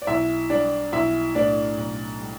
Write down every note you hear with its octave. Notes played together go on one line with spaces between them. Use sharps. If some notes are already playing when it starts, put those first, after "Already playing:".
D5
B1 E4 E5
G3 D4 D5
B1 E4 E5
A2 D4 D5
B1
G3